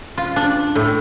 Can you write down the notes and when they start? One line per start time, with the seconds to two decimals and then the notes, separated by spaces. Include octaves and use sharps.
0.18 F4
0.36 D4
0.75 A2